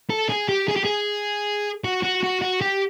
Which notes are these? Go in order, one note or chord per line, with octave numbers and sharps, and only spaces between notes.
A4
G#4
G4
G#4
G4
G#4
F#4
F#4
F#4
F#4
G4